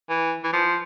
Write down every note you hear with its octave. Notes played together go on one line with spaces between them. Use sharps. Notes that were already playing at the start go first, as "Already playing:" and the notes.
E3
E3
F3